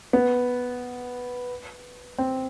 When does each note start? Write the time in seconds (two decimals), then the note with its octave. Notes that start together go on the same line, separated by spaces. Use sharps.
0.13 B3
2.18 C4